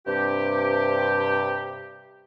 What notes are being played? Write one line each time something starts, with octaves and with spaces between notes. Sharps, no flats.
G2 C3 G4